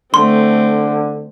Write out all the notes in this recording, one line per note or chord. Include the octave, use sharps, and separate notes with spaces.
D3 A3 C4 C6